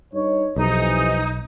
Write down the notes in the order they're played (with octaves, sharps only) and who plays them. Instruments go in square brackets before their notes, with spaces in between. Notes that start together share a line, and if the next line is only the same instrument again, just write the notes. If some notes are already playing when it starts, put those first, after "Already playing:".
[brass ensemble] G2 D#4 C#5
[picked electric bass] B1 [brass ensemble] F2 C3 E3 [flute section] D#4